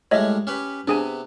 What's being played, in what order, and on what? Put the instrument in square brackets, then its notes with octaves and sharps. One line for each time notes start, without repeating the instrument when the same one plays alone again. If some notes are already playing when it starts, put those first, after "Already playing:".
[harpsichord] A2 G3 G#3 [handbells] C#5 D#5 E5
[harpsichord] C#4 G4 B4
[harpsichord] C3 B3 [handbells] D4 G#4 G#5